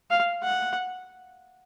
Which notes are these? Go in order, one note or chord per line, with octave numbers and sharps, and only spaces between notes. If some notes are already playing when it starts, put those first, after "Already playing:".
F5
F#5